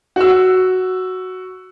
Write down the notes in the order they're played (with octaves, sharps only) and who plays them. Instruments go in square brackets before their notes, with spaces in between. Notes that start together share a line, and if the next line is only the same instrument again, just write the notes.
[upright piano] F#4 E6